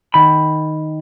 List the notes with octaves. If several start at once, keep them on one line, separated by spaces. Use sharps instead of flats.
D#3 B5